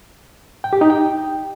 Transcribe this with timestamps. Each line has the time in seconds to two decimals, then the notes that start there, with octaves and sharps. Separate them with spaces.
0.64 G5
0.73 G4
0.81 D#4
0.90 G5